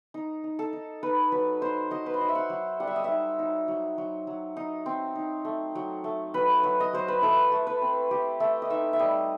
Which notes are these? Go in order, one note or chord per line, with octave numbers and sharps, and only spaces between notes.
D#4
D#4
A4
D#4
D#4 B4
F#3 B4
D#4 C5
F#3 D#5
B4
C5
F#3 D#5
E5
F#5
F#3
G3 F#5
E5
D#5
E5
D#4
D#4
F#3
F#3
F#3
D#4
C4
D#4
A3
F#3
A3
F#3 B4
F#3
D#5
F#3 C5
B4
E4 A4
A3
B4
C4
A3 G4
A3 E5
D#5
D#4 E5
E5
G3 D#5